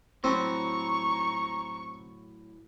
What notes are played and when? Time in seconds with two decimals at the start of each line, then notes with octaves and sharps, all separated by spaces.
0.24 A2 F#3 C4 A#5 C#6